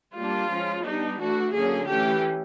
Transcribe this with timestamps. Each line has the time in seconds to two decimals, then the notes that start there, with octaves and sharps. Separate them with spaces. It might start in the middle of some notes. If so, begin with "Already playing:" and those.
0.17 G3 A#3 D4 F4
0.51 F3 G#3 C#4
0.85 G3 B3 D4 D#4
1.20 E3 A3 D4 F#4
1.54 D3 F#3 A#3 C#4 G#4
1.89 E3 A3 C#4 G4